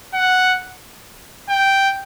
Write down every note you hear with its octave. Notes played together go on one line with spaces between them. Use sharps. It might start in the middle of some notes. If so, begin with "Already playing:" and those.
F#5
G5